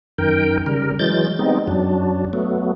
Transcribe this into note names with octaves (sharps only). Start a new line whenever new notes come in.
F#2 D#3 A#4 G5
C#3 G3 A#4
E3 F#3 G#3 G6 A6
G3 G#3 B3 C4 D#4
F#2 F#3 D4
F#3 A3 B3